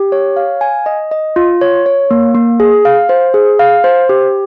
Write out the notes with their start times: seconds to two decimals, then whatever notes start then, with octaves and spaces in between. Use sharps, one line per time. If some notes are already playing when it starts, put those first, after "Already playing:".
Already playing: G4
0.12 C#5
0.36 F5
0.61 G#5
0.86 D#5
1.11 D#5
1.36 F4
1.61 C#5
1.86 C#5
2.11 A#3
2.35 A#3
2.60 G#4
2.85 F5
3.09 C5
3.34 G#4
3.59 F5
3.84 C5
4.09 G4